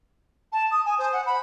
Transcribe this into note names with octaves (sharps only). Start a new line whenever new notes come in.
A5
D#6
G#5
C5
F#5
B5